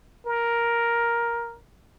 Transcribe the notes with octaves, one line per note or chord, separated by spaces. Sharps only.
A#4